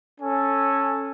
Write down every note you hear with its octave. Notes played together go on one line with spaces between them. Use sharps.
C#4 A4 G#5